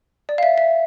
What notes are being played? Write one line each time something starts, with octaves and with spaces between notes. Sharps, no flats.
D5
F5
E5
E5